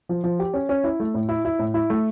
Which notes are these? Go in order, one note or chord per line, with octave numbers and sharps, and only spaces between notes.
F3
F3
G4
C#4
C#4
E4
A3
A2
E4
E4
A2
E4
A3